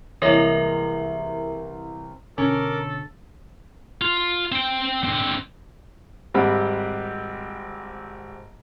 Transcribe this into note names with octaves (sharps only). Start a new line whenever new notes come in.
C2 E3 G#3 A#3 E4 A#4 C#5 E5
B2 D3 C#4 A4 A#4 D6
F4
C4 G5
D3 C4
G#1 G3 C4 G4 F#5 B5